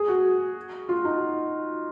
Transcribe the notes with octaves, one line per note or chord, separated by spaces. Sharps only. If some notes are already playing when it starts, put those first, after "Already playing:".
Already playing: G#4
F#4
F4
D#4